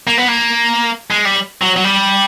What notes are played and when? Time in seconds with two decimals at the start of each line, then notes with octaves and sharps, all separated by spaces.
0.07 A#3
0.18 B3
0.28 A#3
1.10 G#3
1.25 G3
1.62 F#3
1.76 F#3
1.84 G3